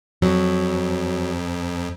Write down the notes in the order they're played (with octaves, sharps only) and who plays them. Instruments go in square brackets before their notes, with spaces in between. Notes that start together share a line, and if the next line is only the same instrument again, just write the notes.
[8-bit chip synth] F2 [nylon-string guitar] F#3